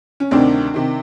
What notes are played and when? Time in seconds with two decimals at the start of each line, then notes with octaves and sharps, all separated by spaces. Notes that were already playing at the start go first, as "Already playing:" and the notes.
0.20 C#4
0.31 D2 C3 D#3 C4 D4
0.74 C3 D#3